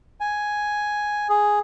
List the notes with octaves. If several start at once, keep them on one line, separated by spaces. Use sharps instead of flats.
G#5
G#4